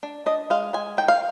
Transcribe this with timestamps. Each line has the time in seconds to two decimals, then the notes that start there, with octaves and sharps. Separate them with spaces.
0.03 D4
0.26 D4 D#5
0.50 G#3 F5
0.73 G#3 G#5
0.97 D#3 G5
1.08 F5